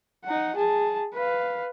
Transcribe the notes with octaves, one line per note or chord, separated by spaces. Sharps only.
D#4 F#5
G#4 A5
B4 F5